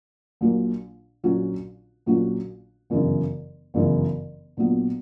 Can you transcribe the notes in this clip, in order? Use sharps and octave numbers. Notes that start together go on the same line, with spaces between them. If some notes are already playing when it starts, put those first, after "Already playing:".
A#1 A#2 F#3 A#3
A#1 A#2 F#3 C#4 F#4
A#1 A#2 F#3 C#4 F#4
G1 F#2 C#3 E3
G1 F#2 C#3 E3
A#1 A#2 F#3 B3